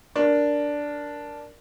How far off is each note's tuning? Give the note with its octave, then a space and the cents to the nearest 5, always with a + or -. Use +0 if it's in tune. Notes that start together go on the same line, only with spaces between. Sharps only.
D4 -5 A#4 +0